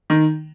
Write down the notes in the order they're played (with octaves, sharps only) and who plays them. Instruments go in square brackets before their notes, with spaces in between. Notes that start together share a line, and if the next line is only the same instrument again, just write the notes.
[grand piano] D#3